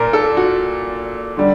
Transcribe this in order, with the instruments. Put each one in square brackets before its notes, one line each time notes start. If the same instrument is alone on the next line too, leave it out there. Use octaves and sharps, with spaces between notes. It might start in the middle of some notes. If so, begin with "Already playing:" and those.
Already playing: [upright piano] A#2 A#4
A4
F#4
D3 G3